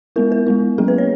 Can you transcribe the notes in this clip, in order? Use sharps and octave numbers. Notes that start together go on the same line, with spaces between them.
G#3 B3 E4 A#4
A#4
G#3 B3 E4
F#3 A#3 C#4 G#4
B4
C#5